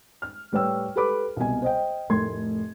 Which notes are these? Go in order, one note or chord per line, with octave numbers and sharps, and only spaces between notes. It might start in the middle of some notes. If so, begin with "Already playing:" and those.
F6
A2 G3 B4 C#5 G5 E6
G4 A4 B4 B5 D6
C2 B2 G#5
C5 D#5 G5
F1 A2 A#4 C6 G#6